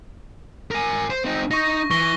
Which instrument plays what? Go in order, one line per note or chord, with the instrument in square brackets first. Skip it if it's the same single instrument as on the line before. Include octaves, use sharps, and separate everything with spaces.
[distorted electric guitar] A#4 G#5
C5
C4 D#4
[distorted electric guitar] D#4 [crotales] C#6 A#6
[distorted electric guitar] E3 [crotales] C#6 A#6 G7